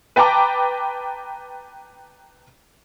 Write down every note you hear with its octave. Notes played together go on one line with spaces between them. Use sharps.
B4 G5 A5 A#5 D6